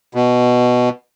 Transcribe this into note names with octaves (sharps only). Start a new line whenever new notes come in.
B2